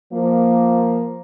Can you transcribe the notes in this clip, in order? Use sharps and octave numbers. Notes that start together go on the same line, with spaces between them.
F3 A#3